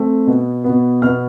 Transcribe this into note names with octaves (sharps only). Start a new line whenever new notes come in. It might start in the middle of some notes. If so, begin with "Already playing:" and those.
Already playing: A3 C4
B2 B3
B2 B3
B2 B3 F6